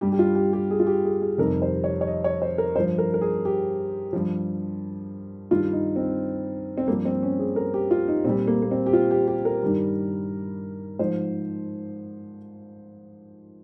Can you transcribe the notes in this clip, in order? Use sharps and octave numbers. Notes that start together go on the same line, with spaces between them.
G2 G3 G4
G4
F4
G4
G4
G#4
F4
G4
G#4
G#4
F2 C3 D#3 G3 A#4
C5
C#5
C#5
D#5
C#5
C5
A#4
G2 F3 C5
A#4
A#4
G#4
G4
G2 F3
G2 D#3 G3 F4
D#4
C4
C4
G2 A#3
F3
C4
C#4
G#4
A#4
G4
F4
D#4
A#2 G3 C4
A#3
A#3
C4
G4
F4
G4
G4
A#4
G2 D#3 G3
G#2 F3 C5